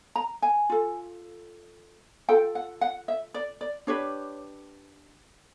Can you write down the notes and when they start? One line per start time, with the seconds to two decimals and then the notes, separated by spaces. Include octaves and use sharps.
0.16 A#5
0.42 G#5
0.69 F4 A4
2.29 F4 A4 G5
2.55 F#5
2.81 F#5
3.08 E5
3.34 D5
3.61 D5
3.87 D4 G4 B4 C#5